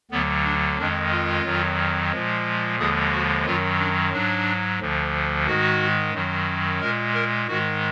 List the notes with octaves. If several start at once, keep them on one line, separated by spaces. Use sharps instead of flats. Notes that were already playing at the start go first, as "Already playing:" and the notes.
D2 D3 F#3 B3
D4
F2 D#3 G#3 D4
F4
F2 D#3 F#3
A#2 F3 G#3
D#2 D3 F3 G#3 G#4
F#4
F#2 D#3 F#3 F4
D4
G#2 F#3 D4
D2 D3 F3
G#2 D#3 G#3 F#4
F#2 D#3 F#3
A#2 G#3 A#4
A#4
G#2 D#3 G#3 F#4